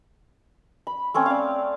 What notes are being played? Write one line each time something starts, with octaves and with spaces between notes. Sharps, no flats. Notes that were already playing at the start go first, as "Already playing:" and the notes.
B5
A3 C4 C#4
D5 F5